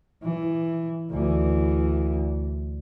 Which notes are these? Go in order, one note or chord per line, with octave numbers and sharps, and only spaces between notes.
E3
D2 E3